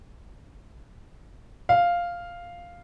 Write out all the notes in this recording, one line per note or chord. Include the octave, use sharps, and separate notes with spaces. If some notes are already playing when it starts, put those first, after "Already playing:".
F5